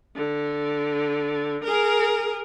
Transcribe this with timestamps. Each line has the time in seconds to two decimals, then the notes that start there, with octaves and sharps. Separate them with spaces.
0.15 D3
1.64 G#4 A#4